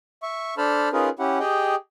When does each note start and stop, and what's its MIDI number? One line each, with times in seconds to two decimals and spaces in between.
0.23 0.55 76
0.23 0.55 85
0.58 0.89 62
0.58 0.89 69
0.58 0.89 72
0.58 0.89 81
0.58 0.89 83
0.58 0.89 89
0.93 1.09 61
0.93 1.09 63
0.93 1.09 65
0.93 1.09 68
0.93 1.09 70
0.93 1.09 71
1.19 1.39 61
1.19 1.39 64
1.19 1.39 67
1.19 1.39 78
1.40 1.75 67
1.40 1.75 68
1.40 1.75 75
1.40 1.75 79